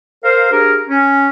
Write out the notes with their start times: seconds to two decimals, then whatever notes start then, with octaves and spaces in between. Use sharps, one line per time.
0.24 A#4 C5 F5
0.52 D4 G4 G#4 A#4
0.88 C#4